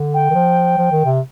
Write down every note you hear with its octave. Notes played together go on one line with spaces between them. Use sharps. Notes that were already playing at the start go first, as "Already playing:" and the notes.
Already playing: D3
G5
D#3
F3
F3
D#3
C3